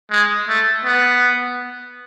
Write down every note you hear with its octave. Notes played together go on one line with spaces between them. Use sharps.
G#3
A3
B3